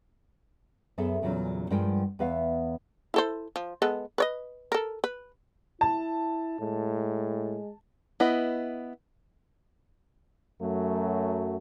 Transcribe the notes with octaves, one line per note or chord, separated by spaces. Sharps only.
F#2 B3 G#4 A4 E5
E2 A#2 C#3 F#3 C#4
G2 F3 G#3 A#4 F#5 G5
E2 B3 B4 E5 F5
E4 A4 C5
F3
G#3 B3 A4
B4 C#5 D#5
A4 A#4
B4
E4 A5
A2 G#3
B3 E4 D#5
F#2 F#3 A3